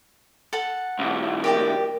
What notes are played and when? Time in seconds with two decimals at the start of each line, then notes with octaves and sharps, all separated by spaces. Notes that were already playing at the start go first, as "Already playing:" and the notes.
0.53 A4 F#5 A5
0.99 B1 E2
1.44 G4 A#4 D5 G5